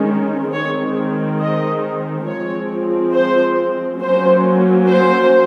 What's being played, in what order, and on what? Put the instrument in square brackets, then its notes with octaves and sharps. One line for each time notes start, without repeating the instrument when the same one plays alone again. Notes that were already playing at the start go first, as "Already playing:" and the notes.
Already playing: [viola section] D#3 G#3 C#4
D#3 G#3 C4 C#5
D#5
F3 G#3 C4 C#5
C5
F#3 A#3 C#4 C5
C5